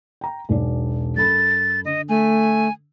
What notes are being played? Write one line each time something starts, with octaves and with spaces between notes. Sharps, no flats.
G5 A#5
E1 B1 D5
F#2 A4 B5 A6
D3 D#5
A3 G#5